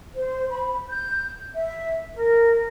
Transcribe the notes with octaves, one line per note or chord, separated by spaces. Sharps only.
C5
B5
G6
E5
A#4